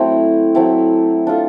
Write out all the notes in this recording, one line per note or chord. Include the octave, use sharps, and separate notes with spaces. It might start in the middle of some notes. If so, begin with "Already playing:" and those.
Already playing: F#3 A3 C4 E4
F#3 A3 C4 E4
D4 F4 A4